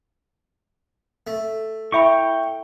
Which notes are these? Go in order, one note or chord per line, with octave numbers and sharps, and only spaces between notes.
A3
E4 E5 G5 B5 C#6